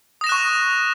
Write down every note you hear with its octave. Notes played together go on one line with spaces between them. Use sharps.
C#6 D#6 F#6 A#6 E7